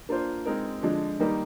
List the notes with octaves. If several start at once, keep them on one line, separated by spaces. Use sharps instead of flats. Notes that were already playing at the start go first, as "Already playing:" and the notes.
A#3 D4 F4 C5
G#3 C4 D#4 A#4
D3 F3 G#3 D4
D#3 G3 A#3 D#4